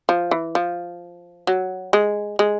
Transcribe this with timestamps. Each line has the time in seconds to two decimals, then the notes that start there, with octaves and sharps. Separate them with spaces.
0.09 F3
0.31 E3
0.55 F3
1.47 F#3
1.93 G#3
2.39 G#3